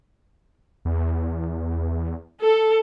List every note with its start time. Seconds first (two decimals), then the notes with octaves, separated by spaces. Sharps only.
0.85 E2
2.40 A4